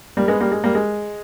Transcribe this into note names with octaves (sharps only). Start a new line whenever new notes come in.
G3 A#3
G#3 B3
G3 A#3
G#3
G3 A#3
G#3